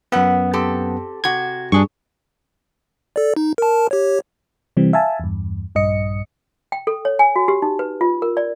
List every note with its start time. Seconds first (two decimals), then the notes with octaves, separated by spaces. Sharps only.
0.12 F#2 B3 E5 F#5
0.53 C4 G4 A4
1.24 C3 F#4 G#6
1.72 G2 D4 G#4 C#6
3.16 A4 D5
3.36 D#4
3.58 A#4 A5
3.91 G4 C#5
4.77 C3 E3 G3 C4
4.93 E5 F5 G#5 A5
5.20 E2 G2
5.75 A#1 G2 D#5 C#7
6.72 G5
6.87 A4
7.05 C#5
7.19 G#5
7.36 F#4
7.48 G4
7.62 D#4
7.79 B4
8.01 F4
8.22 A#4
8.37 D5